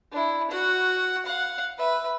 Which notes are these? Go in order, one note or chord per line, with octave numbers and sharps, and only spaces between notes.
D4 E4
F#4 F#5
F5 F#5
B4 E5